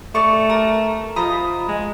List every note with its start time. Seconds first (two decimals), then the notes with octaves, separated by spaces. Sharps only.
0.15 A3 D5 C#6
0.50 A#4
1.16 F3 D#5 A#5 B5
1.68 G#3